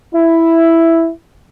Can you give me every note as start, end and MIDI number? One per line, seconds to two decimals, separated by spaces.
0.15 1.10 64